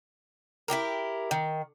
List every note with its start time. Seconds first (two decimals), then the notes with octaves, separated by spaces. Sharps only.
0.68 E4 F#4 G4 A#4
1.31 D#3